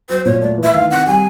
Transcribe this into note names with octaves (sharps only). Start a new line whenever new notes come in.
F#3 C5
A#2 C#5
A3 D5
E3
E5
D#3 F5
C3 F#5
G3 G#5